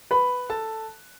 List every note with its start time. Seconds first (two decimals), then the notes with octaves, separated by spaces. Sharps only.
0.11 B4 B5
0.50 A4 A5